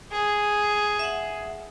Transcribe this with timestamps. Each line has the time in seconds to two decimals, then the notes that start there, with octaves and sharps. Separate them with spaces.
0.12 G#4
0.99 E5 F#5